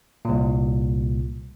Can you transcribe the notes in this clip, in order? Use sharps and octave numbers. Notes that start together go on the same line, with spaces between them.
C2 A#2